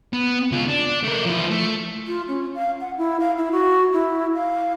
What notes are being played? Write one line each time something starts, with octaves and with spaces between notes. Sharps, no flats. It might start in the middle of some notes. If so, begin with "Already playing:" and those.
B3
C#2 F4
D4
A3 A#4
F3 E4
A3
F4
C#4
F5
F#5
E4
F5
E4
F#4
E4
F5